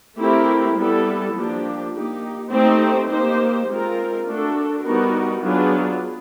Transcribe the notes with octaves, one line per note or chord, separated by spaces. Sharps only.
A3 C4 E4 G4 A#4
G3 B3 E4 A4
F3 A#3 D4 G4
A#3 D#4 G4
A3 C4 D#4 G4 C5
A#3 D#4 G4 C5
G#3 C4 F4 A#4
A3 D4 F#4 A4
G3 B3 D#4 F#4 A#4
F#3 B3 D4 F4 G#4